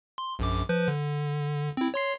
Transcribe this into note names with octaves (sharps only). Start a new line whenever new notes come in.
C6
A#1 F#2 D6
F3 B4 G6
D3
C4 E4
C#5 C6 C7